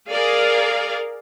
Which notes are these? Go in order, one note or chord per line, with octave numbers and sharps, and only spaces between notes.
G#4 A#4 D5 F5